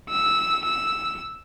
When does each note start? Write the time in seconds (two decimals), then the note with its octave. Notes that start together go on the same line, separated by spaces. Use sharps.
0.09 E6
0.65 E6